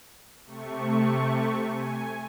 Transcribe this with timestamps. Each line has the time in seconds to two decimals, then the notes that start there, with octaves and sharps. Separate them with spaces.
0.45 C3 A3 C#6
1.71 G#5